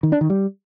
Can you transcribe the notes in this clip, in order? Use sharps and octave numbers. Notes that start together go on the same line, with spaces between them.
D#3
D4
D#3
G3